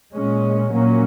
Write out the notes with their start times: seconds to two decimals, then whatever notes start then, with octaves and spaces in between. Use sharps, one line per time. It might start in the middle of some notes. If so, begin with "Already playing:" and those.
0.13 A#2 G#3 C#4
0.70 A#2 F#3 A#3 C#4